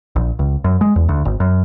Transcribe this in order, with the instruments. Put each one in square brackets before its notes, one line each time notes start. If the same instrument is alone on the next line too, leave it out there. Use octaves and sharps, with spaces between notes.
[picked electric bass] A#1
C#2
F#2
G#3
E2
D2
G#1
F#2